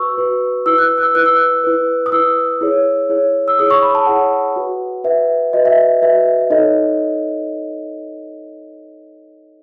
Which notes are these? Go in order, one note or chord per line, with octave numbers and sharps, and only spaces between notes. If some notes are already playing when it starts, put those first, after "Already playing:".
Already playing: F#4 B4 C#6 E6
F#4 B4
E4 B4 E6
F#6
F#6
E6
E4 B4 F#6
E6
F#6
E4 B4
D#6
E4 B4 E6
E4 G#4 C#5
E4 G#4 C#5
E6
E4 G#4 C#5 D#6
C#6
B5
A5
E4 G#4 C#5 F#5
F#4 B4
F#4 B4 E5
F#4 B4 D#5
E5
E5
F#4 B4 E5
E5
D#4 A4 C#5 D#5